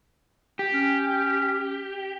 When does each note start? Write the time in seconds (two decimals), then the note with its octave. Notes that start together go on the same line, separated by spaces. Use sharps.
0.59 G4
0.73 C#4